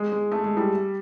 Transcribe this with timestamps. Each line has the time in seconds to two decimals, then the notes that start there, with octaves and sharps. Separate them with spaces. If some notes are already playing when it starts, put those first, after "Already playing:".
Already playing: G#3
0.12 G#3
0.32 A3
0.44 G#3
0.57 G3